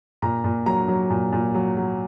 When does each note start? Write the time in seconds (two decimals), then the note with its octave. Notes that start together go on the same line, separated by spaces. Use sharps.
0.22 A#2 A#5
0.44 A#2
0.66 F#3 A#5
0.88 F#3
1.10 A#2
1.33 A#2
1.55 F#3
1.77 F#3